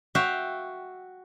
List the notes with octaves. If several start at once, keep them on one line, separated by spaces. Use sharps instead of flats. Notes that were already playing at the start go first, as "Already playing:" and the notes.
F#4 E5 F5 G5